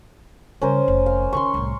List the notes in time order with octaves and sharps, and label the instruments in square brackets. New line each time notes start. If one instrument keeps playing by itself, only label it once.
[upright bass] C#3 G3 [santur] C#4 A#4 C5
[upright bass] F1
[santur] F5
[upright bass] D#3 C#4 [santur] C6 C#6
[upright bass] C2 A2